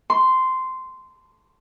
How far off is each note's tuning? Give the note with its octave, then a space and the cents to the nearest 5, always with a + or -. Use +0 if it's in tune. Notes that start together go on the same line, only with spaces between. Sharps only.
C6 -10